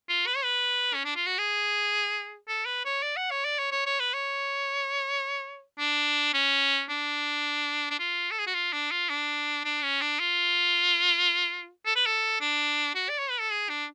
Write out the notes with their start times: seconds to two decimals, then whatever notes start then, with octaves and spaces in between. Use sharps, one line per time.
0.09 F4
0.27 B4
0.36 C#5
0.44 B4
0.94 C#4
1.05 D4
1.16 F4
1.26 F#4
1.38 G#4
2.48 A4
2.66 B4
2.85 C#5
3.03 D5
3.17 F#5
3.31 C#5
3.45 D5
3.59 C#5
3.71 C#5
3.86 C#5
4.00 B4
4.14 C#5
5.79 D4
6.34 C#4
6.90 D4
7.91 D4
7.99 F4
8.31 A4
8.39 G#4
8.47 F#4
8.55 F4
8.73 D4
8.92 F4
9.10 D4
9.64 D4
9.83 C#4
10.01 D4
10.20 F4
11.85 A4
11.96 B4
12.06 A4
12.41 D4
12.95 F#4
13.09 D5
13.19 C#5
13.30 B4
13.40 A4
13.51 G#4
13.69 D4